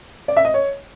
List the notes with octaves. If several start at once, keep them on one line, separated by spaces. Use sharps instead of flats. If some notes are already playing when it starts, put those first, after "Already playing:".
D5
E5
D#5
C#5